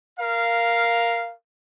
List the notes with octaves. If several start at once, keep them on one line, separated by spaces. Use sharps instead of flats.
A#4 F5